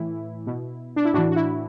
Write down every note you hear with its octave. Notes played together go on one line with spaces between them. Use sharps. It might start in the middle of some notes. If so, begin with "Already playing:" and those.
Already playing: A2 E3 E4
B2
D4
E4
A2 E3 D4 F#4
F#4
E4